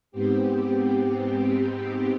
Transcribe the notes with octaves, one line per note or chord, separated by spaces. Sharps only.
G#2 B3 C4 G4